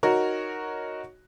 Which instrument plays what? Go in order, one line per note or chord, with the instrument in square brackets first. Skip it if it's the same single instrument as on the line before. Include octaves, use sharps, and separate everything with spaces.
[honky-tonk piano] D#4 F#4 A#4 C#5